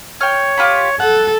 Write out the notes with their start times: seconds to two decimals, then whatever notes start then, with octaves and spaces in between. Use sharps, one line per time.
0.21 C#5 G5 F6
0.57 F4 G4 B5
1.00 A4 F#5